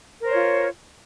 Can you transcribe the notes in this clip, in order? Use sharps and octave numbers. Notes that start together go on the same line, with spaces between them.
F4 A#4 C5 C#5